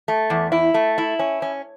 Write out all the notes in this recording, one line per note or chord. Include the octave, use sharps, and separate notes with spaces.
A3
E2
E4
A3
E4
C#4
C#4